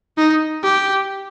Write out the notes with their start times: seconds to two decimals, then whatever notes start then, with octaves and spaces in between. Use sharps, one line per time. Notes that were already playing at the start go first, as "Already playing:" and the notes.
0.18 D#4
0.64 G4